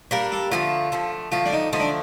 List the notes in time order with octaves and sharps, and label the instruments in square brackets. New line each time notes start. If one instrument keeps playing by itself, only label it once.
[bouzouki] G3 A#3 D4 [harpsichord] A#4
[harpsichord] A4
[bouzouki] D3 F3 A3 [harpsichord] F4
[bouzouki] D3 F3 A3
[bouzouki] D3 F3 A3 [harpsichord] F4
[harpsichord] D4
D#4
[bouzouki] D3 F3 A3 [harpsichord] D#4
[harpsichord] D4